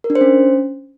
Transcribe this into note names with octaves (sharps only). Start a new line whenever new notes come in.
A#4
D4
C5
C#4